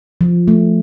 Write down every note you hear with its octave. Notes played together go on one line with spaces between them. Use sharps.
F3
A3